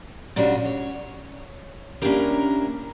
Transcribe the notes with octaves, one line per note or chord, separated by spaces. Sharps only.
A#2 G3 C#4 D4 F#4
C#5
A#3 C#4 D4 E4 G4 A#4